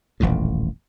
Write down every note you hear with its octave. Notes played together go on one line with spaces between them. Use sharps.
D#1 A1 F2 A2